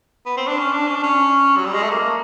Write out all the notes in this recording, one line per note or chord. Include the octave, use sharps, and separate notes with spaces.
B3
C4
D4
C#4
D4
C#4
D4
C#4
F#3
G3
G#3
A3
A#3